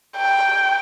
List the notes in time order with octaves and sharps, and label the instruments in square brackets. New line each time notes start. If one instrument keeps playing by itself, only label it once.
[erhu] G5